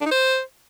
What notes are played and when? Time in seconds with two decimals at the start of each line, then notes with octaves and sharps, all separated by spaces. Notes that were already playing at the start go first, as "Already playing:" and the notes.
0.01 D4
0.06 D#4
0.11 C5